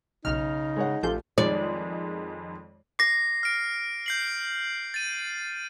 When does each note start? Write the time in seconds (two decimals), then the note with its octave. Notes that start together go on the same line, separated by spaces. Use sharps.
0.25 B1 C#3 D#4 F6
0.76 G#3 C#5 F#5
1.03 A1 F3 F4 G4 A4 G6
1.38 F2 D#3 G#3 D5
2.99 D6 A#6 C7
3.43 F6 D7
4.06 G6 C7 F#7
4.94 A6 D#7